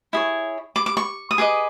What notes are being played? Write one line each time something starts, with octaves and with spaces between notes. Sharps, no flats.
E4 G#4 C#5
D6
D6
C#6
D#6
G#4 B4 D#5 D6